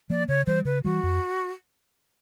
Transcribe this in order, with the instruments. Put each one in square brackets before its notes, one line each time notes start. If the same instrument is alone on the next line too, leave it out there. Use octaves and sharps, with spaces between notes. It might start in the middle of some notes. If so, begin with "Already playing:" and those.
[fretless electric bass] F3 A#3 [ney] D5
[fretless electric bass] C#3 [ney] C#5
[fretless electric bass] E3 G3 [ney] C5
[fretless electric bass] C#3 [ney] B4
[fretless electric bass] E3 G3 [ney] F#4
[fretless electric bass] F2